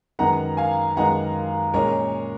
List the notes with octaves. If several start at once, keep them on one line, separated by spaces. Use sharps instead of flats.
F#2 D#3 G#3 B3 F#5 A#5
F5 G#5
F#2 D#3 G#3 B3 F#5 A#5
A#2 G#3 C#4 A#4 C#5